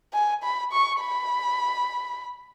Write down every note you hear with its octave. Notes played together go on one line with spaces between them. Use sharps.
G#5
B5
C#6
B5